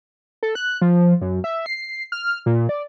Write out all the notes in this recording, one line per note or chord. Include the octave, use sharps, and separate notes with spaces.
A4
F#6
F3
F#2
E5
C7
F6
A#2
D5